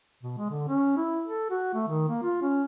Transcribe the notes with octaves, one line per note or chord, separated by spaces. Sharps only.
B2
G#3
D3
C#4
E4
A4
F#4
A3
D#3
A#3
F4
C#4